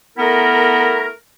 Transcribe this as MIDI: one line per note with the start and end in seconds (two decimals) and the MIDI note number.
0.17 1.08 57
0.17 1.08 59
0.17 1.08 64
0.17 1.08 70